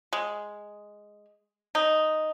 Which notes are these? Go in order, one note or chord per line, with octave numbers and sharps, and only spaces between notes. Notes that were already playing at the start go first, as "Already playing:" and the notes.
G#3
D#4